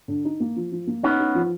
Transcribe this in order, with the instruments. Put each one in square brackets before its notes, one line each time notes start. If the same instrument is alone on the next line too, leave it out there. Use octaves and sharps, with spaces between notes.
[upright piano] D3
D#4
A#3
F3
F3
A#3
[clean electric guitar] B3 C#4 [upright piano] D#4
[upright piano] D#4
F3